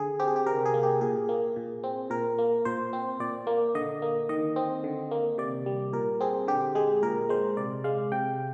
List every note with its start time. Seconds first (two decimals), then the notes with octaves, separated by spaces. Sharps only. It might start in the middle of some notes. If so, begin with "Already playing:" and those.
Already playing: D3 G#4
0.20 C4 G4
0.28 G#4
0.36 G4
0.46 C3 A#4
0.66 G#4
0.74 A#3
0.83 G4
1.01 A#2 G#4
1.29 A#3
1.56 A#2
1.84 C4
2.10 A#2 A#4
2.38 A#3
2.65 A#2 C5
2.93 C4
3.20 A#2 D5
3.47 A#3
3.75 D3 D#5
4.02 A#3
4.29 D#3 D#5
4.56 C4
4.84 D3
5.11 A#3
5.38 C3 D5
5.66 G3
5.93 A#2 A#4
6.21 C4 G#4
6.48 D3 G4
6.75 G#3 G#4
7.03 A#2 A#4
7.29 G#3 C5
7.57 C3 D5
7.84 G#3 F5
8.12 C3 G5